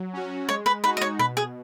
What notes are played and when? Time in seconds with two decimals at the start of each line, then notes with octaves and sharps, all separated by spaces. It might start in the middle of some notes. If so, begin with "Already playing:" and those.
Already playing: F#3
0.13 C#4 F#4
0.49 G#3 C#5
0.66 B4
0.84 D#4 F#4 B4
0.97 D#5
1.01 C#5
1.19 B2 B4
1.37 G#4